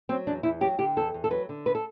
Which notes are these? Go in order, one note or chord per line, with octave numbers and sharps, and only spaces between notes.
F#3 C4
E2 D4
E2 E4
F#3 G4
D3 G4
E2 A4
E2
A4
F#3 B4
D3
D2 B4
A4